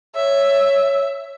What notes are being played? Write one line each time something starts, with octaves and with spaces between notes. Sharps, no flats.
C#5 E5